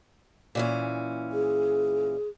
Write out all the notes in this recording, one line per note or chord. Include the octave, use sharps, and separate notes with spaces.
A#2 E3 C#4
G#4